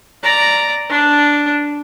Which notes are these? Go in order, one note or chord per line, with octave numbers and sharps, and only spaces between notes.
D5 A#5
D4